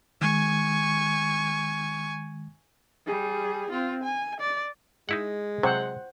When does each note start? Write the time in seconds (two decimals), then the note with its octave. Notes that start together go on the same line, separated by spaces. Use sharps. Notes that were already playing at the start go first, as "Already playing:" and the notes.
0.21 D#3 G#3 G#5 C#6
3.06 G3 G#4
3.70 C4 F4
4.03 G#5
4.40 D5
5.09 G#3 D#4 E4 F#5
5.63 C3 F#3 C5 F#5